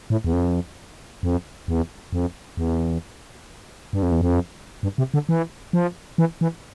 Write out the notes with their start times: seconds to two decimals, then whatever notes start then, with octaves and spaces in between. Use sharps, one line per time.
0.10 A2
0.24 E2
0.33 F2
1.23 F2
1.68 E2
2.13 F2
2.57 E2
3.93 G2
4.03 F2
4.12 E2
4.21 F2
4.83 G2
4.98 C3
5.14 D3
5.29 E3
5.73 F3
6.18 E3
6.41 E3